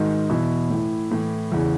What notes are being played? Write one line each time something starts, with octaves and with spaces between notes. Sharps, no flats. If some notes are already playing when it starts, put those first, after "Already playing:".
Already playing: G#2 D#3 F#4
E2 B2 E4
A2 E3
A2 E3
E2 C#3 E3